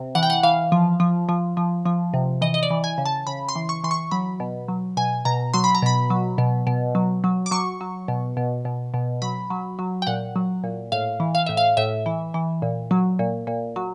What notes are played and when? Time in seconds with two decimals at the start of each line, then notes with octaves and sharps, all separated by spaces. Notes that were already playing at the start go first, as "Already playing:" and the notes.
Already playing: C3
0.15 E3 F#5
0.23 G5
0.30 F#5
0.43 E3 F5
0.72 F3
1.00 F3
1.29 F3
1.57 F3
1.85 F3
2.14 C3
2.41 E3 D#5
2.54 D#5
2.63 D5
2.70 E3
2.84 G#5
2.98 C#3
3.06 A5
3.27 C#3 B5
3.49 C6
3.56 E3
3.69 C#6
3.84 E3 C6
3.91 C#6
4.11 F#3 B5
4.40 B2
4.68 F#3
4.97 B2 G#5
5.25 B2 A#5
5.54 F#3 C6
5.64 B5
5.75 A#5
5.82 B2 B5
6.10 F#3
6.38 B2
6.67 B2
6.95 F#3
7.24 F#3
7.46 D6
7.51 F#3 C#6
7.81 F#3
8.08 B2
8.37 B2
8.65 B2
8.94 B2
9.22 F#3 B5
9.50 F#3
9.79 F#3
10.02 G5
10.07 A#2 F#5
10.36 F#3
10.64 A#2
10.92 A2 F5
11.20 E3
11.35 F5
11.46 A2 E5
11.57 F5
11.77 A2 E5
12.06 E3
12.34 E3
12.62 A#2
12.91 F#3
13.19 A#2
13.47 A#2
13.76 F#3